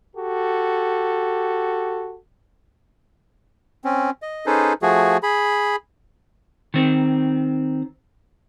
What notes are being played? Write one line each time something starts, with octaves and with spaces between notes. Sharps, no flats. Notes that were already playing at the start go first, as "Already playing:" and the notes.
F#4 G4 A4
C4 C#4
D#5
C#4 D#4 G#4 A4 B4 C5
F3 A3 F#4 G#4
G#4 B5
D#3 C4